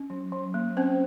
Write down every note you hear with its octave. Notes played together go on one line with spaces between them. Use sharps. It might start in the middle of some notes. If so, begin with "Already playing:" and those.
Already playing: C#4
F#3
F#3
A#3
C4 C#4 C5